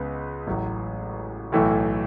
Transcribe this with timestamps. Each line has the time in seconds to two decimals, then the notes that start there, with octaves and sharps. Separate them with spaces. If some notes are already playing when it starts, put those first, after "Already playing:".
Already playing: C#2 C#3 G#3 B3
0.47 A1 A2 F#3
1.52 B1 A2 E3 A3